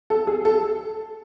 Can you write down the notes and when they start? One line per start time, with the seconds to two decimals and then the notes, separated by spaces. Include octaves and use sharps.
0.10 A4
0.27 G#4
0.45 A4